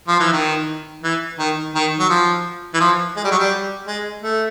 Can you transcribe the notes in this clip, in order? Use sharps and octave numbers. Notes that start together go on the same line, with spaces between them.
F3
E3
D#3
E3
D#3
D#3
F#3
F3
E3
F3
G#3
G3
F#3
G3
G#3
A3